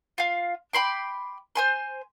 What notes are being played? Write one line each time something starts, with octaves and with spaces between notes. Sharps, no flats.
F4 F5
G5 B5 C6 D6
C5 G#5 C6